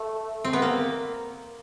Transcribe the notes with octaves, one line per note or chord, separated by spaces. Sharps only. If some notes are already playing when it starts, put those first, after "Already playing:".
Already playing: A3
C4
B3
A#3